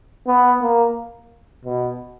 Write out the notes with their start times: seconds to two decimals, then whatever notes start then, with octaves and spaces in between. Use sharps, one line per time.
0.27 B3
0.61 A#3
1.65 B2